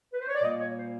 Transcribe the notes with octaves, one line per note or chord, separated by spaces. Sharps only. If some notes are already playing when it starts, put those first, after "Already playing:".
B4
C5
C#5
D5
A#2 G3 A#3 D#5
C#5
C5